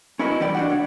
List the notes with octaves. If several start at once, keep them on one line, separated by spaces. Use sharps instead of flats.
C#4 E4 F#4 A#4 B4 D#5
E3 G3 D5 G5
D4 F#4 F#5
C#2 C#5